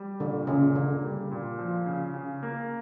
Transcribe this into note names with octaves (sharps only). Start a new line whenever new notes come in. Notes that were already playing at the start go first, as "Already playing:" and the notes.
Already playing: G3
A#2 D3
A#2 C#3
D3 A#3
G3
A#2
F3
C#3
C#3
A#3